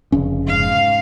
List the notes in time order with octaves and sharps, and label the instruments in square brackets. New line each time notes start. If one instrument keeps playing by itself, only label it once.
[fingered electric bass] F1 C#3 C#4
[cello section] G#2 F5